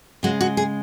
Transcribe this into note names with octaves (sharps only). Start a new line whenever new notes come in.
C#3 G#3 F#4
F#4
G#4